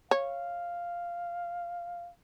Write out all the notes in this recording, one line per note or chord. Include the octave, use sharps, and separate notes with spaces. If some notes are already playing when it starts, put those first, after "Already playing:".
C#5 F5